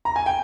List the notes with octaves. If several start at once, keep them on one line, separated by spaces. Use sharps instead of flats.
A#5
G#5
G5